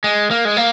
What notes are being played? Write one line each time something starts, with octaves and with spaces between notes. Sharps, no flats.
G#3
A#3
G#3
A#3